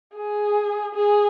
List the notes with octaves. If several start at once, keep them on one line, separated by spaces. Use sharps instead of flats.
G#4
G#4